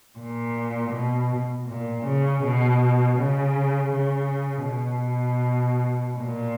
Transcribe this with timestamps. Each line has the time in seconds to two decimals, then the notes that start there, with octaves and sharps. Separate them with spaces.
0.18 A#2
0.92 B2
1.68 A#2
2.06 C#3
2.43 B2
3.18 C#3
3.93 C#3
4.68 B2
6.18 A#2